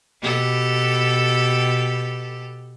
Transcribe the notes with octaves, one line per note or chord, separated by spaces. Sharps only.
B2 G4 A4